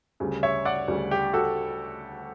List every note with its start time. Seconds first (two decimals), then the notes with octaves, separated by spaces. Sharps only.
0.20 D2 C#3 G3
0.43 C#5 E5
0.65 D5 F#5
0.88 D2 C#3 G3
1.11 G4
1.33 F#4 A4